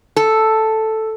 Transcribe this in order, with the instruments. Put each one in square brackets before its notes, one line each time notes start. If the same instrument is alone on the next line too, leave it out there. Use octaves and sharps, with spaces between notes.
[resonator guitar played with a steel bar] A4